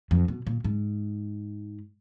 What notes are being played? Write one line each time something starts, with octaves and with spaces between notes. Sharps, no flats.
F2
B2
A#2
G#2